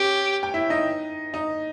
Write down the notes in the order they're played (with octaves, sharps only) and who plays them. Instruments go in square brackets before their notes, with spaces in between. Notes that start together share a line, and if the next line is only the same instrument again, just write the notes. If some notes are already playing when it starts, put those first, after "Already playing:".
Already playing: [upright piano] C#4 C#5 [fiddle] G4
[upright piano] G5
E4 E5
D#4 D#5
D#4 D#5